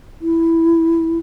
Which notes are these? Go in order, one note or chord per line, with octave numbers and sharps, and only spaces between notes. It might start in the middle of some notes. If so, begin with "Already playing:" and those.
E4